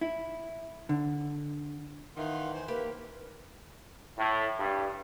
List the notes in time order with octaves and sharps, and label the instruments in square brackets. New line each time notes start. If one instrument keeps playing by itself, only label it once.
[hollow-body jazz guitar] E4
D3
[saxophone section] D#3 E3 [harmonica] F5 F#5 C6
[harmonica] C5 G#5
[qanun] A#3 G4 [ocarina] B4 [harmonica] B5
[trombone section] A2
G2